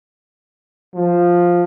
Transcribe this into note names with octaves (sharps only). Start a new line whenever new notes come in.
F3